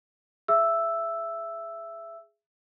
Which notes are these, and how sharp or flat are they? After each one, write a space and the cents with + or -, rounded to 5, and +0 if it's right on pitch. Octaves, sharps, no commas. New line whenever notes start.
G#4 +0 E5 +20 E6 +0